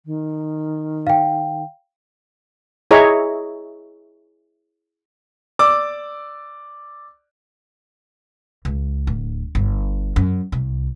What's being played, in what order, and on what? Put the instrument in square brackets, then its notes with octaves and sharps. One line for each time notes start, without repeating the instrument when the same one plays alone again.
[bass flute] D#3
[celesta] F5 G5
[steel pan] E4 G#4 C#5 D#5 E5 A#5
[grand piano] D5 D6 E6
[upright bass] C#2
D1
G1
F#2
C2